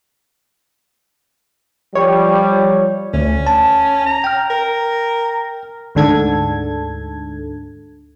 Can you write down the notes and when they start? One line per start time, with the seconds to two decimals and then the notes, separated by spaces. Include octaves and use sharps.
1.95 F3 G3 C#5
3.14 D2 C#4
3.47 A5
4.06 A#5
4.24 G5 F6
4.50 A#4
5.95 D2 G#2 D3 A4 G#6